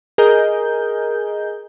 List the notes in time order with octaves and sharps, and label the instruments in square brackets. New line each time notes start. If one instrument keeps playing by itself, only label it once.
[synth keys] G#4 A#4 D#5 G6